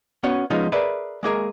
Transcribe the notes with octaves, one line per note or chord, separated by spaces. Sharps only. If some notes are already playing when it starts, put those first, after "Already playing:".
B3 C#4 F#4 C#5 F#5
F3 G#3 B3 C#4 D#4 F4
G#4 A#4 B4 D5 E5
G#3 A#3 G#4 A#4